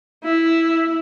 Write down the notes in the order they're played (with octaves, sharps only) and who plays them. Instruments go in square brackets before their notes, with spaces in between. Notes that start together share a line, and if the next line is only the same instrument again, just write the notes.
[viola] E4